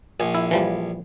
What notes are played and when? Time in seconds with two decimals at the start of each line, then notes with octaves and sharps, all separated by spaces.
0.20 A#1 G#5
0.35 E4
0.51 E3 F3 G3